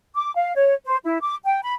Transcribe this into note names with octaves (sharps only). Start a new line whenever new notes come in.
D6
F5
C#5
C5
E4
D6
G5
B5